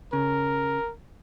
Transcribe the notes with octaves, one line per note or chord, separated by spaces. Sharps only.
C#3 A#4